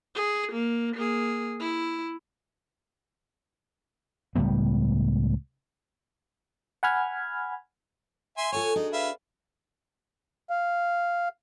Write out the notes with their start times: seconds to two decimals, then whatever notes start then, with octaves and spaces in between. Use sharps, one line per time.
0.15 G#4
0.52 A#3
0.95 A#3 G#4
1.60 E4
4.36 C#2 A2 G3 B3
6.83 F#5 G#5 B5 F6 G#6
8.37 E5 G#5 C6
8.52 F4 A4 C#5 F#5 G#5
8.76 D4 D#4 F#4 G#4
8.93 B4 E5 F5
10.50 F5